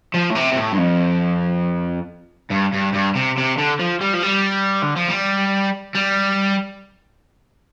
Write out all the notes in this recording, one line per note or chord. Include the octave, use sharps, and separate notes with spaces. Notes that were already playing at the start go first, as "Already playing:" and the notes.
F3
A2
C3
C3
A2
G2
F2
G2
G2
G2
C3
C3
D3
F3
G3
F3
G3
D3
F3
G3
G3